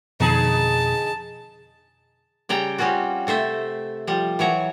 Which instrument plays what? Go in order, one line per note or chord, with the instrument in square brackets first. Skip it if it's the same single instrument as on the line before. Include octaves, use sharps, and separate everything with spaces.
[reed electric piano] F2 B2 [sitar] D3 D#4 G#4 [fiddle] A5
[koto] C#3 G3 G5 A#5
G3 C4 C#4 F4 F#4
C3 A3 C5 E5
F3 G3
E3 F#3 C#5 A#5